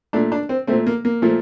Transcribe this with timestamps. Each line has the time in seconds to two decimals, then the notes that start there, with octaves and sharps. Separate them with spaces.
0.13 A#2 A3 D4
0.32 D4
0.49 C4
0.67 A#2 A3 C4
0.87 A#3
1.05 A#3
1.22 A#2 F3 A3